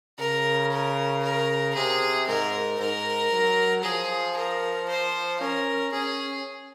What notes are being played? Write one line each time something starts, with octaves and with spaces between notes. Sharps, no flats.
C#3 A#4
A#4
A#4
C3 G#4
G#2 A#4
G#2 A#4
F#3
F3 G#4
A#4
C5
C#4 A#4
C#4 G#4